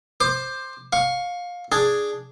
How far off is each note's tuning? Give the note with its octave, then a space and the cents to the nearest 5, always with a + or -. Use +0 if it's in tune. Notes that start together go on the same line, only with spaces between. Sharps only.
C5 +10 D6 +20
F5 +20 C#6 +0
D4 +0 G#4 +0